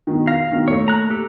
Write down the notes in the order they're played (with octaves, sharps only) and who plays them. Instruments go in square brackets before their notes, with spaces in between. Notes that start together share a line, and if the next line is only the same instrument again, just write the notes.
[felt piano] B2 D#3
[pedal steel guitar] F5 [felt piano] A#6
[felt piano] B2 D#3
[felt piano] A#2 A3 [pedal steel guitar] C#5
[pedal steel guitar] A#5 F#6
G4 A4